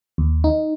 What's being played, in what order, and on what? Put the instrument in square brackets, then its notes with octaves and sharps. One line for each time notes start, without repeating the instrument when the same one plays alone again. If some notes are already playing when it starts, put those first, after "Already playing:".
[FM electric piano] D#2
D#4